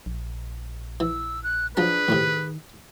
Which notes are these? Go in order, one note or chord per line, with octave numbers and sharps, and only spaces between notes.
A#1
E3 E6
F#6
F3 F#3 D4 G#4 B4 A5
A1 A2 C3 D#3